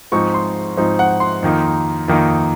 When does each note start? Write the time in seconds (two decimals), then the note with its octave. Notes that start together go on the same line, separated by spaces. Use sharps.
0.12 G#2 F3 C4 D#4 C#6
0.34 C6
0.77 G#2 F3 C4 D#4
0.99 F#5
1.20 C6
1.43 F2 D#3 A#3 D#4
2.08 F2 D#3 A#3 D#4